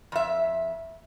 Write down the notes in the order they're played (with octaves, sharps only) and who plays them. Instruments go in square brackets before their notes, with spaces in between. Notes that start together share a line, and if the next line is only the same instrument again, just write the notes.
[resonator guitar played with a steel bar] F2 E5